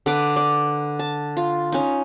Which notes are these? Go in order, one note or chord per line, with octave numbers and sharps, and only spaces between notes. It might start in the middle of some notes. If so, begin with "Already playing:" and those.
D3 B4 D6
D5
A5
F4
C#4 D#4